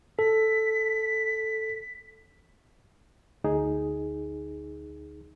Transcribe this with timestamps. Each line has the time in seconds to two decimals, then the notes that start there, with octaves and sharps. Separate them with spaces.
0.19 A4 B6
3.44 D2 D#4 G#4